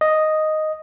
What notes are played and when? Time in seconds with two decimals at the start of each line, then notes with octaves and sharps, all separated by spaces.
0.01 D#5